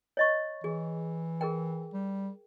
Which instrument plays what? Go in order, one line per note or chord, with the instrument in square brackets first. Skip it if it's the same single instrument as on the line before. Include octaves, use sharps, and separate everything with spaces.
[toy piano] C#5 D#5 C#6
[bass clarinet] E3 [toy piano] G#4
[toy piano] G#4 A#4 G5
[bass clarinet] G3